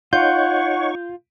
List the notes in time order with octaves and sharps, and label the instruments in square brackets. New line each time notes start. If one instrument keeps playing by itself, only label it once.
[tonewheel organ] D#4 C#5 C#6 [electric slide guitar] F4 [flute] F#5 [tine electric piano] G6